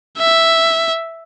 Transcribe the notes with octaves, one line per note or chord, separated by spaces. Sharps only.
E5